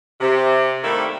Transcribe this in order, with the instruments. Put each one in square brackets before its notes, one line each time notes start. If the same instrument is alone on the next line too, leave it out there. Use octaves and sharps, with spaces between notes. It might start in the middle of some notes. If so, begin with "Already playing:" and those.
[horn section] C3
D#3 G3 A3 A#3 E4